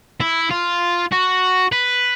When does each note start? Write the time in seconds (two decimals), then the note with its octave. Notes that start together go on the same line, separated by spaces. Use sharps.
0.20 E4
0.50 F4
1.12 F#4
1.72 B4